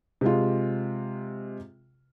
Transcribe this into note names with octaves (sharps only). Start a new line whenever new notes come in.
C3 G#3 F4